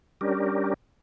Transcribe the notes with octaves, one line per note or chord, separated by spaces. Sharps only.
G3 C#4 D4 G4 A#4